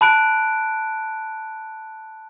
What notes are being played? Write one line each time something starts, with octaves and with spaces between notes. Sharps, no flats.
A5 B5 F#6 D7